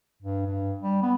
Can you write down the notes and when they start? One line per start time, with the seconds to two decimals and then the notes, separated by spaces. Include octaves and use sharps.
0.22 G2
0.46 G2
0.83 G3
1.02 B3